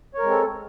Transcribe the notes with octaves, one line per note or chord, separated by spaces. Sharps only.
G#3 C4 A4 A#4 C#5